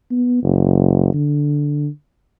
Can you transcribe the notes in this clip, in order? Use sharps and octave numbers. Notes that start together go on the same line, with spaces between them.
B3
F#1
D3